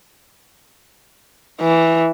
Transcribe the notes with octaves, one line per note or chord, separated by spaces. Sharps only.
E3